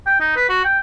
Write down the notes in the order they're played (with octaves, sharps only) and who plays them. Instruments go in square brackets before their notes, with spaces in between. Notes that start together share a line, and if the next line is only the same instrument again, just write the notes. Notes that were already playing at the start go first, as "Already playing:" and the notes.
[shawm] G5
D#4
B4
F#4
G5